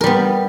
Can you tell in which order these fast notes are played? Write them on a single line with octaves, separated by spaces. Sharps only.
A#4 G3 B3